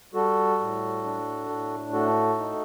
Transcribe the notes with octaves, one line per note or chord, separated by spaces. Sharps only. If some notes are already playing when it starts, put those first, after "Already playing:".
G3 F#4 A4
A2
D4
A2
A3 F#4 A4
D#4